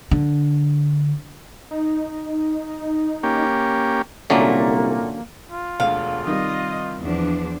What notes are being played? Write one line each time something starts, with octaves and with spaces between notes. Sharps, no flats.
D3
D#4
A#3 C#4 G4
C2 A#2 D3 F#3 A3 A#3 C#4
F4
E1 D2 F5
C3 D#3 G3 D#5
E2 F3 D4